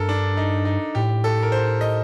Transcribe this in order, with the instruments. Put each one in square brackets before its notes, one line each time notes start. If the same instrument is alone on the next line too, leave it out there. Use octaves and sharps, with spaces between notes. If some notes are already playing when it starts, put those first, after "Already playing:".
Already playing: [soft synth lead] G2 [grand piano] A4 A#4
[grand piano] D4
D#4
D#4
[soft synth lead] A2 [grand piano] G4
[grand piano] A4
A#4
C5
D#5